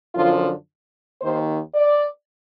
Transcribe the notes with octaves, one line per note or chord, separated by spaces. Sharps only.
F#2 D3 F3 F4
D#2 D#3 C5
D5